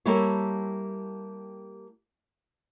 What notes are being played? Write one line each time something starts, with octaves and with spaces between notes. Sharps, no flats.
G3 A#3 E4 G4 A4 C#5